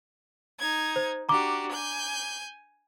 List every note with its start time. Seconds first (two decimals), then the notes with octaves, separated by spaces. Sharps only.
0.59 D#4 G#6
0.96 C5
1.29 D4 F#4 G4 A#5 D6
1.71 G#5 G6